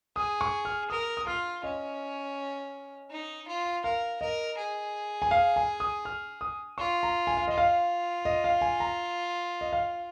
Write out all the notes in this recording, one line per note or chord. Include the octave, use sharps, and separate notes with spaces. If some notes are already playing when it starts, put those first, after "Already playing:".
G#4 D#6
C#6
F6
A#4 D#6
D#6
F4 F6
C#4 D#5
D#4
F4
A#4 F5
A#4 D#5
G#4
G#5
F5
G#5
D#6
F6
D#6
F4 C#6
A#5
G#5
F5
F4 D#5
F5
D#5
F5
G#5
A#5
D#5
F5